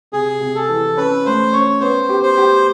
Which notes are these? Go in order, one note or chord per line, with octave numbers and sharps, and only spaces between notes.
C3 G#4
C3
A4
E3
C#4 B4
A3 C5
C#4 C#5
B3 C5
G4
C5
G4